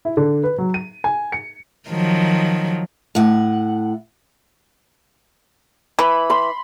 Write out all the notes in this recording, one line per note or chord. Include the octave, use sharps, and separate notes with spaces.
E4
D3
B4
F#3
D#7
G#5
C#7
D#3 F3 F#3
A2 F#5
E3 B5
B5 C6